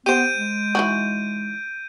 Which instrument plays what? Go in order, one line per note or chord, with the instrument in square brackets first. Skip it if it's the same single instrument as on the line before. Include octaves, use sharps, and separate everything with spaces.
[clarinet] B3 [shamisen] G4 C5 [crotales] G6 D7 D#7
[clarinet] G#3
[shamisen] E3 D#4 F#4